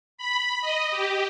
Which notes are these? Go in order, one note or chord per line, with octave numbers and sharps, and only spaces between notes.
B5
D#5
G4